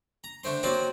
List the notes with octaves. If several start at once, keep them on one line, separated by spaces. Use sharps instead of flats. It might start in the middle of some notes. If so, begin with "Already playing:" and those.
A#5
D3 A3 C4 C6
F#3 A#3 C4 D5 D#5